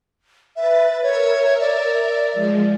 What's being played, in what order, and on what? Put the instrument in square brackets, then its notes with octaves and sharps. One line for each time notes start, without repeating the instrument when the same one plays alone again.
[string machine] B4 A6 [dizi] E5
[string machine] A#4 E5 [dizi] C#5
[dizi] D5
[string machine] F3 G#3